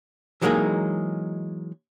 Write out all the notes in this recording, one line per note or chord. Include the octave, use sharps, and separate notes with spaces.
E3 F#3 G#3 A#3 D#4 G#4